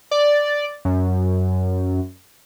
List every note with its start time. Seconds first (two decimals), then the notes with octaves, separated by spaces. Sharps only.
0.11 D5
0.85 F#2